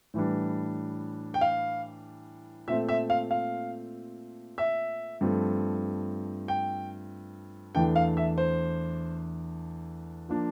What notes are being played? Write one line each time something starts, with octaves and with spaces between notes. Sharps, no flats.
A2 E3 G3 D4
G5
F5
A#2 A3 C4 E5
E5
F5
F5
E5
G2 F3 A3 C4
G5
E2 E3 A3 D4 G5
F5
E5
C5
F3 A#3 D4